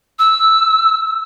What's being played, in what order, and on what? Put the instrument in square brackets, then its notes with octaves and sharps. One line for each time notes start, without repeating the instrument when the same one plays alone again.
[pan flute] E6